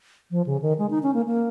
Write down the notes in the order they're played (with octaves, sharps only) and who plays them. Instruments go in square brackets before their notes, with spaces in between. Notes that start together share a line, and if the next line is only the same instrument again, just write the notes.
[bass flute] F3
C#3
D#3
G#3
D#4
C#4
A#3
A#3